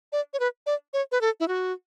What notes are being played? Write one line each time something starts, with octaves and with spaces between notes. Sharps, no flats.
D5
C#5
B4
D5
C#5
B4
A4
E4
F#4